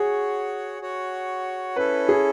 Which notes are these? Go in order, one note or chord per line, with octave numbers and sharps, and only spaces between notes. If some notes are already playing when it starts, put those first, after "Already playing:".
Already playing: F#4 G#4 C#5 F#5
F#4 C#5 F#5
C#4 E4 A4 B4
G#4